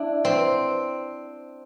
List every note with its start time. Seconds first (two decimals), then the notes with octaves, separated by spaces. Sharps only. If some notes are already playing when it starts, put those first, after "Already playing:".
Already playing: D4 E4
0.25 C4